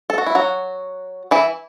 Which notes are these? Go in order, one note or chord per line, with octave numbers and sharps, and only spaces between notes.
A4
F#4
E4
F#3 F#4
E3 E4